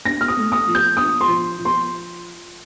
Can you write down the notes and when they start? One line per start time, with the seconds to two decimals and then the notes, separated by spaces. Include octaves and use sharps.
0.05 D4 A#6
0.21 F6
0.28 D#6
0.37 A3
0.52 D#6
0.67 F3
0.75 G6
0.97 D4 D#6
1.21 C6
1.28 F3
1.58 F3
1.65 C6